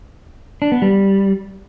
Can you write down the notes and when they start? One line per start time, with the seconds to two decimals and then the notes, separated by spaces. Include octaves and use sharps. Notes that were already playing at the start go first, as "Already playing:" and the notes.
0.62 D4
0.72 B3
0.82 G3